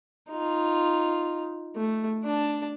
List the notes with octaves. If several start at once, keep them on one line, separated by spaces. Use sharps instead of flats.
D#4 F4
A3
D4 A5